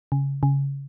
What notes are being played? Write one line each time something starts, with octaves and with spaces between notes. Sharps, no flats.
C#3
C#3